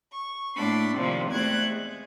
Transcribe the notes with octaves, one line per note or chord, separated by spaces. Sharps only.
C#6
A2 A#3 D4 B5 C6
C3 D#3 F3 G3 A#3
E2 G3 A3 C4 F#6 G#6
G#3